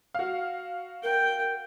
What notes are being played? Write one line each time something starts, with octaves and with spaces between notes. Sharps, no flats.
F#4 F5
A#4 G5